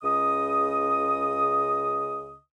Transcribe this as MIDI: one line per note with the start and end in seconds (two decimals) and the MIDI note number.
0.03 2.38 37
0.03 2.38 49
0.03 2.38 75
0.03 2.38 87